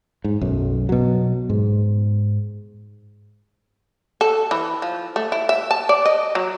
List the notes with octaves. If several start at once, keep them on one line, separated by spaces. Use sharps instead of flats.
G#2
B1 F#2
B2 F#3
G#2
A4
E3
F3
A3
E4
E5
A5
D5
D#5
F#3